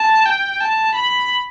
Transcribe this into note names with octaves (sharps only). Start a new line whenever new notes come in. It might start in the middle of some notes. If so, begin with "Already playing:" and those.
Already playing: A5
G5
A5
B5